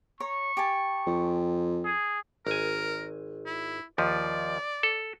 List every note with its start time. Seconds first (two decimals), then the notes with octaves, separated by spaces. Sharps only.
0.20 C#5 A#5 C#6
0.57 G4 G#5 A5
1.07 F2
1.85 G#4
2.47 G#1 A#4 G#5
3.46 E4
3.98 D#2 F3 D5
4.83 A4